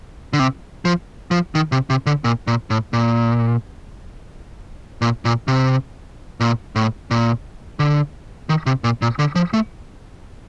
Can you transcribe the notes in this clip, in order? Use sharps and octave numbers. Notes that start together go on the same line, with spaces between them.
D3
C3
F3
F3
D#3
C3
C3
D3
A#2
A#2
A2
A#2
A#2
A#2
C3
A#2
A2
A#2
D3
D#3
C3
A#2
A#2
D3
F3
A3